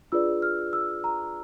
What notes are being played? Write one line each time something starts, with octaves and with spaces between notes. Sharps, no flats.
D4 F4 G#4 B4 D5 E6
F6
E6
A#5